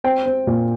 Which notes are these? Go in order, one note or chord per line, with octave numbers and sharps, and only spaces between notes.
C4 G5
C4
A#2